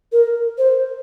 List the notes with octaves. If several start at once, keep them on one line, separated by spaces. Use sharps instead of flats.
A#4
C5